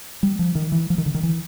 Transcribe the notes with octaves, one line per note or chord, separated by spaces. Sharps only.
G3
F3
D#3
E3
F3
D#3
D3
D#3
E3